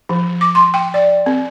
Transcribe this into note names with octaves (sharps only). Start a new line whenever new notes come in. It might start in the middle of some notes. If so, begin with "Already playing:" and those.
F3
D6
C6
G5
D5
C4